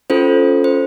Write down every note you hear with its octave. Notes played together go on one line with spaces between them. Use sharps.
C#4 F4 A4 C5
C5